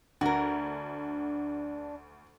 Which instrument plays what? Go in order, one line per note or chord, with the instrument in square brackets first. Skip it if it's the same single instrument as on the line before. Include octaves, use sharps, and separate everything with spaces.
[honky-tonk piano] D2 [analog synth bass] D4 [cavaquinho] F#4 A#4